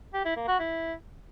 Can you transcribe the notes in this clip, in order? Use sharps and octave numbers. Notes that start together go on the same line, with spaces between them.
G4
E4
A#3
F#4
E4